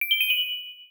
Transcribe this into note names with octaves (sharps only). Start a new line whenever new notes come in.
D7
G7
D#7
F#7